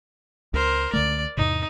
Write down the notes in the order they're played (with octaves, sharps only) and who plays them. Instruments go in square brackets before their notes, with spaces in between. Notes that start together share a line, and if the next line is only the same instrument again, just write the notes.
[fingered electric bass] C#2 [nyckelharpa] A#4 C5
[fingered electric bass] C#2 D3 A3 [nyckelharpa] D5
[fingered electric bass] E2 G#2 C3 [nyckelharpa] D#4